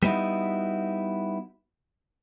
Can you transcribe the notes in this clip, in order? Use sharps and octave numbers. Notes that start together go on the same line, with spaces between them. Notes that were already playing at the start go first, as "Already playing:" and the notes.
G3 B3 D#4 E4 F#4